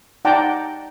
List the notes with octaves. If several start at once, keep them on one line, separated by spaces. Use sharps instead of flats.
D#4 D5 F#5 G5 A5 A#5